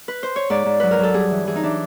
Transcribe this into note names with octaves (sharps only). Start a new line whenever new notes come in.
B4
C5
C#5
G#2 D5
G#2
F#3 B4
A#4
F#3 A4
G2 G#4
E3
E3 G#4
D#4
E3 D4